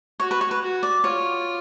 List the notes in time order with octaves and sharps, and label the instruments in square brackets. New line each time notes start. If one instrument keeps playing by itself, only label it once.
[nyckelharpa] F#4 [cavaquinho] C#5
[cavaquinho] B4
C#5
B4
[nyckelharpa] F#4
[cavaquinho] D5
[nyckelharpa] F4 [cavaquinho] C#5